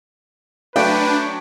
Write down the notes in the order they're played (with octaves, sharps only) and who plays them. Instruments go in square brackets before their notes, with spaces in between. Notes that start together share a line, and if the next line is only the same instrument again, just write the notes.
[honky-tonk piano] F#3 A3 [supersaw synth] D4 [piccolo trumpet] B4 [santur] G5